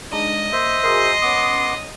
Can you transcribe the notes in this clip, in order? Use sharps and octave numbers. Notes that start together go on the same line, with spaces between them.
G#3 D4 D#4 D#5
A#3 C5 E5
F#4 G#4 A#4 C6
B3 C#4 D6 D#6